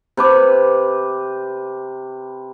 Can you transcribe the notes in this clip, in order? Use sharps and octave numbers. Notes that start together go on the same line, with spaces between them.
C3 B4 D6